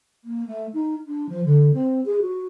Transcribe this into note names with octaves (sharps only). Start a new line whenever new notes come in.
A#3
A3
D#4
D4
F3
D3
C4
G#4
F#4